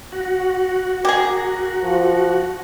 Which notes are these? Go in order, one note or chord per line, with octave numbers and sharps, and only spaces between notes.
F#4
G4 G#4 A#4
F3